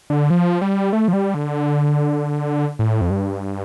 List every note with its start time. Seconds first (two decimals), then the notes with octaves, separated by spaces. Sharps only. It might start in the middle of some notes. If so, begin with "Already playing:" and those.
0.10 D3
0.30 F3
0.61 G3
0.93 A3
1.08 F3
1.13 G3
1.34 D3
2.79 A2
3.01 F2
3.10 G2